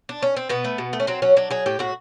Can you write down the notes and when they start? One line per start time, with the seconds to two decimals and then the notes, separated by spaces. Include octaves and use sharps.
0.09 D4
0.22 C#4
0.37 C4
0.49 B2 B3
0.64 A3
0.78 B2
0.93 A3
1.00 C#4
1.07 F#3 C4
1.22 F#3 C#4
1.37 F#3 D4
1.50 F#3 G#4
1.66 A2 G4
1.79 A2 F#4